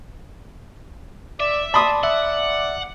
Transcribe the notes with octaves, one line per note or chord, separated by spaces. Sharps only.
D5 E5
D5 A5 B5 C6 D#6
E5 F#5